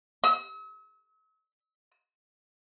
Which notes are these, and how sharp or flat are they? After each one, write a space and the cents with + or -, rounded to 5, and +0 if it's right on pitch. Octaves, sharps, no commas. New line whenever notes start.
E6 -45